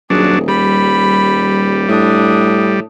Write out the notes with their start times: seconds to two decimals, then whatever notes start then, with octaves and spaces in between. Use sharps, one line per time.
0.10 D#1 F#3 D4 G#4
0.48 G3 B5
1.89 A2 D4 D#6